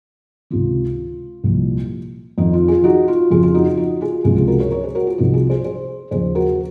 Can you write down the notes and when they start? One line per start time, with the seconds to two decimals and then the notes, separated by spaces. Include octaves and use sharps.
0.50 C#2 C3 D#3 F4
1.44 C2 A#2 F3
2.38 F2 D#3 D#4
2.53 F4
2.68 F4 G#4
2.84 D#4 F#4
3.08 F4
3.30 F2 C#3 F3 F4 G#4
3.43 F4
3.54 D#4 F#4
3.66 F4
3.77 D#4 F#4
4.01 F4 G#4
4.24 C#2 C3 F3 F4 G#4
4.36 F4 G#4
4.47 F#4 A#4
4.60 A#4 C#5
4.71 A#4 C#5
4.83 G#4 C5
4.95 F#4 A#4
5.07 F4 G#4
5.18 C2 C3 F3 D#4 F#4
5.33 F4 G#4
5.50 G#4 C5
5.65 G#4 C5
6.11 D#2 C#3 F3 G#4 C5
6.35 F#4 A#4